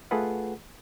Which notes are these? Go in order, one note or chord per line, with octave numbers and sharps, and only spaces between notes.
A3 F4 G#4 A4 B4 F#5